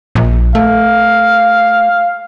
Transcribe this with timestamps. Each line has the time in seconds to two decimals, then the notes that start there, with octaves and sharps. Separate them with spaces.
0.15 A#1
0.55 A3 F5